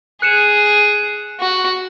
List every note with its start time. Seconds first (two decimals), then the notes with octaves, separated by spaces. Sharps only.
0.22 G#4 F#6 C#7 E7
1.40 F#4